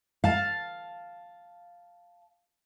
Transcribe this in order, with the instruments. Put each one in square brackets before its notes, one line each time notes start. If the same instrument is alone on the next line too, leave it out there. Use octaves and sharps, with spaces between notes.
[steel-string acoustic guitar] F5 A5